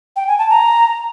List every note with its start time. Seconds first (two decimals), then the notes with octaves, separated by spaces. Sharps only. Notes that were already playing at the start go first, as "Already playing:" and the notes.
0.16 G5
0.27 G#5
0.39 A5
0.50 A#5